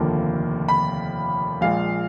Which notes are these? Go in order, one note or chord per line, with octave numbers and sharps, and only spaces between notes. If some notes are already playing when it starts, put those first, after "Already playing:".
Already playing: F1 D#2 D3 F3 A#3
B5
A#1 A#2 G#3 F5